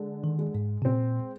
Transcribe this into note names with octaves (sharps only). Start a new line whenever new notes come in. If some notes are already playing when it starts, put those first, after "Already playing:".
Already playing: D3 G#3
D#3
G#3
G#2
C3
A#2 C4